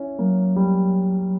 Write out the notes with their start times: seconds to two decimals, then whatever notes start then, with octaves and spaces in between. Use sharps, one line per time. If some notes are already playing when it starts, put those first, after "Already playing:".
Already playing: C#4 E4
0.19 F#3 A#3
0.56 G3